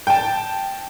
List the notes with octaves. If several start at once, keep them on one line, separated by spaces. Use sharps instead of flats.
G5 A5